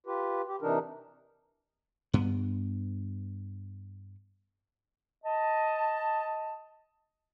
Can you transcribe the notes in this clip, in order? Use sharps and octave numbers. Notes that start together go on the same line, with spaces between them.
F4 G4 B4
G4
C3 E3 D4 D#4 A#4
G2 B3
D#5 A5